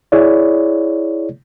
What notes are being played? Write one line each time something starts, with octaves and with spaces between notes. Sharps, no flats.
E4 G#4 C#5 D5